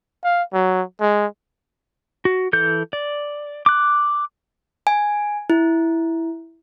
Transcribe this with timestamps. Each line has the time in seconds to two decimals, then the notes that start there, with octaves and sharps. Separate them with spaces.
0.24 F5
0.53 F#3
1.00 G#3
2.25 F#4
2.53 E3 A4 G6
2.93 D5
3.66 D6 F#6
4.87 G#5
5.50 E4